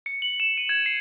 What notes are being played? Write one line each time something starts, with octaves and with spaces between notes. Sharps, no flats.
C#7
F#7
E7
D#7
G#6
C7